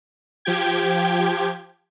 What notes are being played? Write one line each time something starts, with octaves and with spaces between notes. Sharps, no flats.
F3 G4 G5 G#6